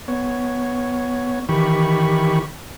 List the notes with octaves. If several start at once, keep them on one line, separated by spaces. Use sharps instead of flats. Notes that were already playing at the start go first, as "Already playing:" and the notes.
B3 C#5
D#3 E3 G4 B5 C#6